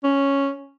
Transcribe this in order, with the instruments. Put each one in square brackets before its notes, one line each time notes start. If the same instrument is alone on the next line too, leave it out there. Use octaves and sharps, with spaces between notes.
[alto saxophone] C#4